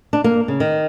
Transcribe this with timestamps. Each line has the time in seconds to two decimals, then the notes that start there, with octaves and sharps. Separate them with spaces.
0.13 D4
0.24 A#3
0.48 C#3
0.60 D#3